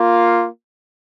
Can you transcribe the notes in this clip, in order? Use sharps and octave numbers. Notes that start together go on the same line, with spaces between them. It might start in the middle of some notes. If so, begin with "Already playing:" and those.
Already playing: A#3 F4